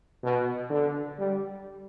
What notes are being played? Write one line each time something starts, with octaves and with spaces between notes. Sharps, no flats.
B2
D3
G3